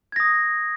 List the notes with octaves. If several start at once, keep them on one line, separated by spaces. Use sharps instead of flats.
D#6 G#6 A#6